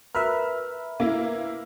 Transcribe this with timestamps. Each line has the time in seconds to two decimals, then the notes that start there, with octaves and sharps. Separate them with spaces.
0.15 A#4 B4 E5 F6
1.00 A#3 E4